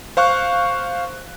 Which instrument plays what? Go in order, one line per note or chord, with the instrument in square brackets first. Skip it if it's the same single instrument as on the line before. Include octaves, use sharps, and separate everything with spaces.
[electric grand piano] C5 F5 C#6 F#6